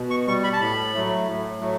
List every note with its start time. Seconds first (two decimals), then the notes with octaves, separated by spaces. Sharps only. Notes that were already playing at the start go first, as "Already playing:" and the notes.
Already playing: B2
0.10 C#6
0.27 G3 C#6
0.44 B5
0.53 A5
0.60 A2 B5
0.94 F#3 A3
1.26 A2
1.60 F#3 A3